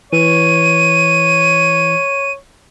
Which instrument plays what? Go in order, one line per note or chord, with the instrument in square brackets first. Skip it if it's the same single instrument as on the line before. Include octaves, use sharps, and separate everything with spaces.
[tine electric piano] E3 [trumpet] C#5 [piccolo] D#7